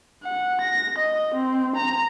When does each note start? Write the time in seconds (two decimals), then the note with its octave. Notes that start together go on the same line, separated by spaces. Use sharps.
0.24 F#5
0.61 A#6
0.98 D#5
1.34 C4
1.76 A#5